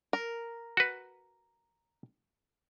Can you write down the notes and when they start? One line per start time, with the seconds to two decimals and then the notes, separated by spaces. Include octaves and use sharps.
0.13 A#4
0.77 F#4 B4